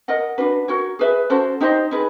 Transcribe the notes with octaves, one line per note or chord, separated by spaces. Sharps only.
A#4 D#5 F#5
D4 F#4 B4
F#4 A#4 C#5
G#4 B4 E5
C#4 F#4 A4 C5
D#4 G4 C5 D#5
D#4 G#4 B4